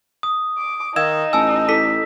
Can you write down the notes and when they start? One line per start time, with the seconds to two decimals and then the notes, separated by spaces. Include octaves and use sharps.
0.23 D#6
0.58 D6
0.96 D#3 D#4 F5 E6 G#6 E7
1.33 A1 G#5 A5 E6
1.69 E4 A4 B6